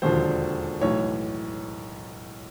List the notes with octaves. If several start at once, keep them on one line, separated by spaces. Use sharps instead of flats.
E1 D#2 D3 F3 C5
B1 A2 E3 C#5